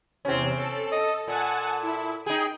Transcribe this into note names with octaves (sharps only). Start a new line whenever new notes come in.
E2 C3 C4 C#4
A4
D#5
A#2 A4 F#5 G#5 A5
E4
D#4 G#4 G5